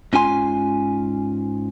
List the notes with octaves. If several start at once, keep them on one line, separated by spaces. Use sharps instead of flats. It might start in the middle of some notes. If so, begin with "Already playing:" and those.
G#2 C#4 F4 G#5 C6